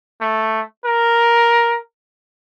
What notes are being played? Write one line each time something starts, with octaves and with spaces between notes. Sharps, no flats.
A3
A#4